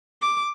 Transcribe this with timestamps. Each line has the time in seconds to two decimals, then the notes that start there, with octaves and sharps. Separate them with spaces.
0.22 D6